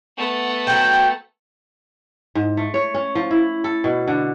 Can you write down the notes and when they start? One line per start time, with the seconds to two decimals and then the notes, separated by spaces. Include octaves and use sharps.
0.18 A3 B3 F#5
0.67 F#3 G5 G6
2.35 G#2
2.57 A3
2.74 C#5
2.94 C#4
3.15 F3
3.31 E4
3.64 A4
3.84 B2
4.08 D3